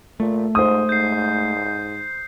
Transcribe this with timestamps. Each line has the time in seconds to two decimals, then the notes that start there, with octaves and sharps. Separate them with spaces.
0.20 A#2 A3
0.55 G#2 C5 D#6
0.89 G#2 G6 C7